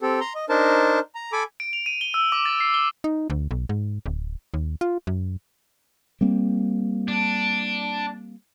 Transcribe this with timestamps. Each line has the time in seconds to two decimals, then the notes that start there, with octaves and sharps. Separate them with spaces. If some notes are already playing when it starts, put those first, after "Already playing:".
0.01 C4 G4 A4
0.20 A#5 C6
0.35 D#5
0.49 D4 D#4 A#4 C5 A5
1.15 A#5
1.32 A4 G#5 B5 D6
1.60 D7
1.73 F7
1.86 D#7
2.01 G7
2.14 E6
2.32 D6
2.46 A6
2.60 C7
2.74 G7
3.04 D#4
3.30 D2
3.51 B1
3.69 G#2
4.06 D1
4.54 D#2
4.81 F4
5.07 F#2
6.21 G3 A#3 C4
7.08 D4